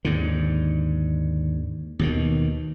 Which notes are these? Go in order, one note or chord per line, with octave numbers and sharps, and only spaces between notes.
D#2 G#2 D3
D#2 B2 D#3